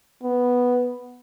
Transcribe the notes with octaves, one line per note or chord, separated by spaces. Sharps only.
B3